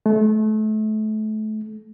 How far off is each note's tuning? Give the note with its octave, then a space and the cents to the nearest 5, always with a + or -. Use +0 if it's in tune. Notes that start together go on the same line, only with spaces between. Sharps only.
A3 -30